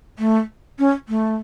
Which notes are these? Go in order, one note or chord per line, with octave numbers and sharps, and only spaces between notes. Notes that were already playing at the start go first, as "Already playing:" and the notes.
A3
C#4
A3